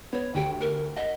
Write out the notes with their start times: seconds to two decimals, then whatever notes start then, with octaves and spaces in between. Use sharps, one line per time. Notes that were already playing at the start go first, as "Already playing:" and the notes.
0.13 B3 C#5
0.34 D2 G4 G5
0.60 A#4
0.96 D#5 F#5 B6